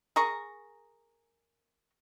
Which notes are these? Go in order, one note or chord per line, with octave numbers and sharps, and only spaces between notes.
G#4 A#4 A#5 C#6